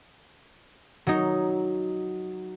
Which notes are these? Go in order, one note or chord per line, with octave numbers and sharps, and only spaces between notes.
F#3 D#4